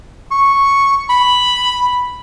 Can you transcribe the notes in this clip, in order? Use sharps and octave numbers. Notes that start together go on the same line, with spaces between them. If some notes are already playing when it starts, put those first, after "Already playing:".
C#6
B5